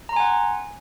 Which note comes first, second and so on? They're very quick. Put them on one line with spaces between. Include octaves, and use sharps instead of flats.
A#5 C6 G#5 F#5